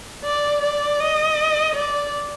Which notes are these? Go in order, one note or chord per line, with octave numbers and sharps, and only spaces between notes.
D5
D5
D#5
D5